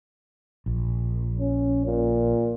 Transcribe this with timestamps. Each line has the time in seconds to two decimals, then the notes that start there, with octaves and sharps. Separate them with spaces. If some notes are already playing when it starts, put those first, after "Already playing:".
0.66 A#1
1.40 C#4
1.86 A#2